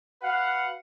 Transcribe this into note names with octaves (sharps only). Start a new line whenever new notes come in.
F#4 B4 F5 F#5